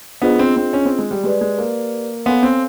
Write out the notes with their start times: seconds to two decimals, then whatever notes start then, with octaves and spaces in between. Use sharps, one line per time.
0.22 B3 D4 F4 G#4 C5 D#5
0.39 C4
0.56 C4
0.73 C#4
0.85 C4
0.99 G#3
1.11 G3
1.24 G#3 G4 B4 D5
1.41 G#3
1.58 A#3
2.26 B3 A4 C#5 F5 G#5 C6
2.43 C4